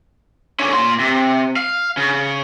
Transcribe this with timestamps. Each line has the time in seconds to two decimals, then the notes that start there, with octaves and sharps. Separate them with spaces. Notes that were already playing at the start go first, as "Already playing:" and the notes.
0.60 D3 C#4
0.73 A#2 C6
1.00 C3
1.56 F5
1.97 C#3